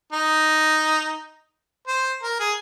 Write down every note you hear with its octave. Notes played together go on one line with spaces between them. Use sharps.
D#4
C5
A#4
G#4